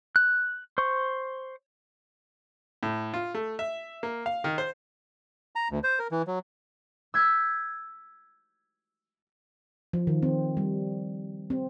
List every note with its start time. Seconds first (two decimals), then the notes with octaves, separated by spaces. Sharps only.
0.16 F#6
0.78 C5 C#6
2.83 A2
3.14 F4
3.34 A3
3.59 E5
4.03 A#3
4.26 F5
4.44 D#3
4.58 C5
5.56 A#5
5.71 D2
5.84 C5
5.99 A#4
6.11 E3
6.27 F#3
7.14 E6 G6 G#6 B6
9.93 F3
10.07 D#3
10.23 C4
10.57 G3
11.50 C4